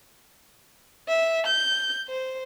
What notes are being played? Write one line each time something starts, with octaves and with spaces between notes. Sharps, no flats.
E5
G6
C5